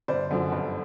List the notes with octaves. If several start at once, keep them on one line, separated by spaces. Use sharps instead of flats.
G1 C5 D5
F#2 D3 F3
G1